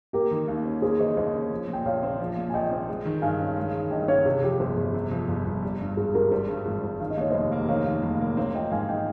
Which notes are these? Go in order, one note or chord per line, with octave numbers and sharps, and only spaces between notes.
A#3 G4 A#4
D#3
D#2
C#4
A#3 G#4 C5
D#3 C5 D#5
D#2 C5 D#5
C#4
F3
A#2
G5
A#1 C#5 F5
C4
F3
A#2
G#5
A#1 D#5 G5
C4
G#3
D#3
G2 F5 G#5
C#4
G#3
D#3
G2 D#5 G5
C#4 C#5 F5
C3 G#4
F2 G4
G1 G#4 C5
G1
C3
F2
G1
G1
G3
G2
G#1 G#4
G#1 G4 A#4
G3 G#4 C5
G2
G#1
G#1
D#3 F5
D#5
D#2 C#5
F1 C5 D#5
A#3
D#3 C#5 F5
D#2
F1
A#3
C4 C#5 F5
F3 D#5 G5
G#2 F5 G#5
D#5 G5